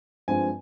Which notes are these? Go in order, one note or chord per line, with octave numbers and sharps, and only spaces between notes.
G2 F3 G#3 C4 G#5